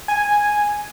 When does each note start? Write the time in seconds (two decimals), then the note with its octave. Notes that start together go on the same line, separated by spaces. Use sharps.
0.08 G#5